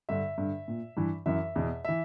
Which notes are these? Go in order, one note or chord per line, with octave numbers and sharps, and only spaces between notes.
G2 D3 E5
G2 D3
A#2
G2 E3
F#2 E3 E5
E2 B2
E3 E5